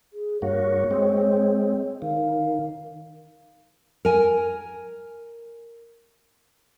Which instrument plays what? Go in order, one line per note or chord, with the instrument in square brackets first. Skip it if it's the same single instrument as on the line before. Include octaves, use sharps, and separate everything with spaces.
[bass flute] G#4
[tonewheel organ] G2 A#3 F#4 [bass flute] C#5
[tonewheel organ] G#3 C4
[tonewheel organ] D#3 [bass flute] F5
[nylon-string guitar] A#4 G#5